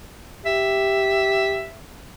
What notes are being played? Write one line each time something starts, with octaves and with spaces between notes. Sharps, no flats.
G4 E5